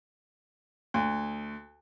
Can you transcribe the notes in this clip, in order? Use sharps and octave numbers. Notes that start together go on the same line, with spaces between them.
D2